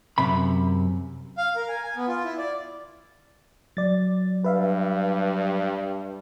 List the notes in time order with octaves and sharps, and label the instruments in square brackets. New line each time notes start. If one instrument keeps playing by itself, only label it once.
[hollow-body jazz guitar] F#2 C3 B5
[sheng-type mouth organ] F5
A#4
G#5
G#5
B3
F4
E4
D5
[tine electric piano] F#3 [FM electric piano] D5 A6
[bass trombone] G2 [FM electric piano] B4 E5 F5